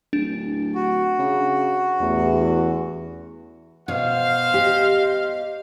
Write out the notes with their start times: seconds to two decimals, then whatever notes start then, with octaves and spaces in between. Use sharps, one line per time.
0.13 D1 D4
0.75 F#4
1.19 C#3
2.00 A1 E2
3.88 B2 C5 F5
4.54 G4 D#5